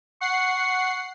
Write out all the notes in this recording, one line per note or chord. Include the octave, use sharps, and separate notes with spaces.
F#5 C#6 C7